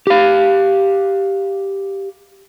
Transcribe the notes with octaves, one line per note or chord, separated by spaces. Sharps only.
G4 F5